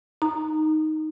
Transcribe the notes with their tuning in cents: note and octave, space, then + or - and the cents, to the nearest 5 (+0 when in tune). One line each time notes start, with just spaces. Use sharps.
D#4 +0 A#5 -15